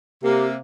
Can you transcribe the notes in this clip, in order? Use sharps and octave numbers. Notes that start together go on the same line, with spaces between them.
C3 A#3 G4